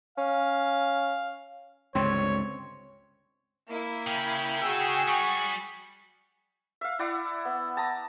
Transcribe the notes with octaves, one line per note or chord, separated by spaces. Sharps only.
C#4 F5
C#2 G2 D3 C4 C#5
A#3 E4
C#3 C#4 G5
F#4 G#4 E6
G3 C#6
E5 F5
E4 D5 E5 F#5
B3
A5 A#5 D#6